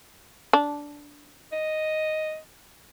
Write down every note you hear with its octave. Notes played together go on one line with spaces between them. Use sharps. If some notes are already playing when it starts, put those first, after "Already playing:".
D4
D#5